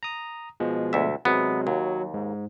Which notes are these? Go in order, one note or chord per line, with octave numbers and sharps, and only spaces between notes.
A#5 D#6
B2 F3 G#3
D2 E5
C3 F#3 G#3 B3
D#2 F#3
G#2